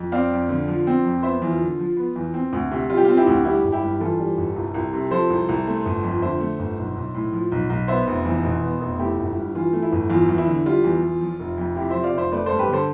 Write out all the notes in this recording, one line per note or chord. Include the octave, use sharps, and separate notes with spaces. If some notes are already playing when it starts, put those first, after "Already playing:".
Already playing: F2
C4 D5 F5
F2
D3
F3
C4
F2
B3 C5 E5
E2
F4
D3
F3
B3
E2
C4
D2
C3
G3 F4
G4
C4 F4
E4 G4
D2
G3 E4 G4
G1
E4 G4
G2
E3 F4 A4
G3
G1
C2
C2
C3
F3 A4 C5
C2
C2
A3
G1
F2
D3 C5 E5
A3
G1
B1
B1
A2
F3
B1
B1
B3 C5 E5
F1
E2
B2
B3
F1
A3 E4 G4
G1
G2
E3 F4
A3
E4
G1
E2 F4
E2
E4
D3
G3 F4
E2
E2
F3
F1
F2
C3 E4 G4
F3 C5 E5
D5 F5
F1 C5 E5
A3 B4 D5
G2 A4 C5
G4 B4
D3 A4 C5